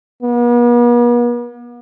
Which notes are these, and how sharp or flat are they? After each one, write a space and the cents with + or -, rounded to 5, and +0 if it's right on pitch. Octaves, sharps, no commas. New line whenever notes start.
B3 -45